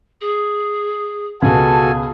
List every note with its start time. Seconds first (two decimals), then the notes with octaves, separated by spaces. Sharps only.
0.21 G#4
1.42 C#2 B2 F#4 G#4 A4 G#5 A5